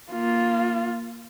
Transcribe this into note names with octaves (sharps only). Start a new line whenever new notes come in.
A#3 F4